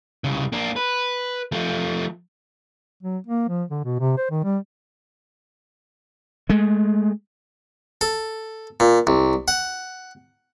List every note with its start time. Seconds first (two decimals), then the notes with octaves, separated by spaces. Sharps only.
0.24 C2 C#3
0.52 A#3 D4
0.76 B4
1.52 F3 A3
3.03 F#3
3.27 A#3
3.48 F3
3.70 D3
3.85 B2
3.99 C3
4.17 C5
4.31 D#3
4.44 G3
6.49 G#3 A3
8.01 A4
8.80 A#2
9.07 C2
9.48 F#5